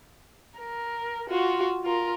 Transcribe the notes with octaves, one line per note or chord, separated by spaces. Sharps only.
A#4
F4 F#4
F4 A#4